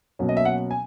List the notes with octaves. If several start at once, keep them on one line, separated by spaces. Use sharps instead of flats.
B2 F#3 A#3 C#4
D#5
E5
F#5
G#5